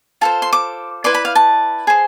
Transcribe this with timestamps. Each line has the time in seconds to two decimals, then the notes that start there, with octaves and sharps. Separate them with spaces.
0.21 F4 A4 C5 A5
0.42 C6
0.53 D6
1.04 E4 B4 D5 C6
1.14 B5
1.25 F5
1.35 A5
1.87 G#4 C5